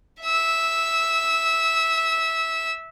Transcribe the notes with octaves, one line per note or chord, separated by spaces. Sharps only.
E5 E6